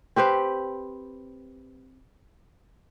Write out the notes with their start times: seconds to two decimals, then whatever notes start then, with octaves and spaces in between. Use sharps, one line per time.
0.16 C4 G4 B4 C5